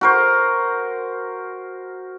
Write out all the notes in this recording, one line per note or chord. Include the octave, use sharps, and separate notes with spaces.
F#4 A#4 C5